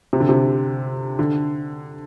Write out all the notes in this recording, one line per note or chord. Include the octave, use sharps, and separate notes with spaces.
C3
D3
C3
D3